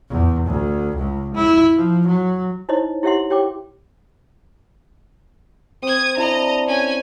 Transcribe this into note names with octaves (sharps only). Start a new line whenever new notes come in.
E2
D2
C#2
E4
F3
F#3
D#4 E4 C5 C#5 D#5
E4 G4 C#5 E5 F#5 C6
G4 C#5 G5 D6
C4 D#6 G#6
D4 E4 A4 D#5 A#5
C#4 G#5